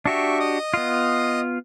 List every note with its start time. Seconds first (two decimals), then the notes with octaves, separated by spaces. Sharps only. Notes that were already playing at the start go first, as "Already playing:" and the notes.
0.06 D4 F#4 G4 E5 C#6
0.40 D#5 D#6
0.74 B3 F4